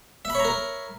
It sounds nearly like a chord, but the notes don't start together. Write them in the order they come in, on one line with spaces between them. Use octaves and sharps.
E5 B5 C#5 A#5 A#4